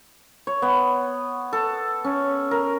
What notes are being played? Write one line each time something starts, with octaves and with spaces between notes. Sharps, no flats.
C#5
B3
A4
C#4
A#4